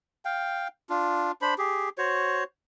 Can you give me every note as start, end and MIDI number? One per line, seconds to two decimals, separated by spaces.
0.25 0.68 77
0.25 0.68 79
0.90 1.32 62
0.90 1.32 65
1.42 1.54 62
1.42 1.54 72
1.42 1.54 83
1.58 1.89 67
1.58 1.89 68
1.98 2.44 66
1.98 2.44 72
1.98 2.44 73